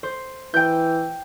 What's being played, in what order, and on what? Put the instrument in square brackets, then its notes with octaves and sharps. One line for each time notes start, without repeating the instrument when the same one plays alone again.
[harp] C5
[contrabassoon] E3 [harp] G5 G6